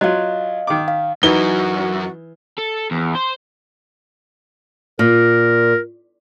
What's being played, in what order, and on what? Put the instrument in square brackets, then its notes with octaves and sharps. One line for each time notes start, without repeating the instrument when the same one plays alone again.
[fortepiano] F#3 F4 [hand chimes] D#5 F5
[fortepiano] D#3 D6
[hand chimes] F5
[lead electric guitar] F#2 [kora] E3 E4 [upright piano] D#4 G7 [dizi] F#4
[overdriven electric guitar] A4
E2
C5
[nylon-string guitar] A#2 [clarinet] A#4